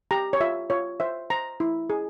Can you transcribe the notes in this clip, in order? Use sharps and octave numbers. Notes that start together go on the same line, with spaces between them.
G4 A#5
C#5
F4 E5
F4 C#5
C5 E5
C5 A#5
E4
G#4